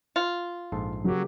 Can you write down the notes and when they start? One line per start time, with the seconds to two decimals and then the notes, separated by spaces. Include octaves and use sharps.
0.16 F4
0.72 A#1 G#2 A4 C6
1.04 C#3 F#3 A#3 G4